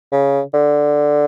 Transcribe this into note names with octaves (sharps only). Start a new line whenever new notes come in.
C#3
D3